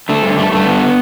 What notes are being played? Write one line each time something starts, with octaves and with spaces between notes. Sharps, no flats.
D3 A3
G2
G2 A3
G2 A3
D3 B3